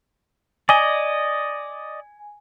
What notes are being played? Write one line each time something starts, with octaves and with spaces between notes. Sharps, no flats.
D5 D#5 G#5